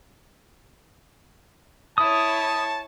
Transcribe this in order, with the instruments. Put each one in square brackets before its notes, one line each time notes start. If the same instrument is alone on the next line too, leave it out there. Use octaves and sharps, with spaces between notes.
[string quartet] E4 C#5 [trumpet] A5 [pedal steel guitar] D#6